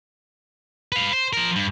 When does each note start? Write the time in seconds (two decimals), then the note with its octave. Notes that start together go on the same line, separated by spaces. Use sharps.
0.92 B4 F5
1.13 C5
1.33 F3 A#4
1.56 G2